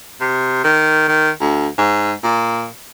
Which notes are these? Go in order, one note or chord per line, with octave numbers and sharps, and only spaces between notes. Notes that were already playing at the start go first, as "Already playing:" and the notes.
C3
D#3
D#3
D2
G#2
A#2